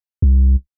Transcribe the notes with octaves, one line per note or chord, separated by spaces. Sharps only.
C2